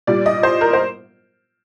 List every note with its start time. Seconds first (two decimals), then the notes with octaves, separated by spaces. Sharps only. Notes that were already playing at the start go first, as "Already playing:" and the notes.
0.07 A#2 G3 D5
0.26 D#5
0.43 C5
0.61 A#4
0.73 C5